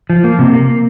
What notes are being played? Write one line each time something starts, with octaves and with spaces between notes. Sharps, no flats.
F3
A#3
C3
A#3